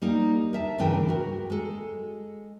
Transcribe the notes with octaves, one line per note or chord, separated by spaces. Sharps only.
G3 A#3 D#4
A#4 E5 A5
D2 G2 C#3 E3 A#4 G5
F#4 A#4
G#3 A4